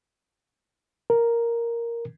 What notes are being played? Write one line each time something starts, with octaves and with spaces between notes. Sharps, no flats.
A#4